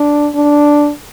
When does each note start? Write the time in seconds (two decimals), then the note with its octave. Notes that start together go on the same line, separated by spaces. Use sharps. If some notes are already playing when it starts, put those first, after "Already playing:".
Already playing: D4
0.35 D4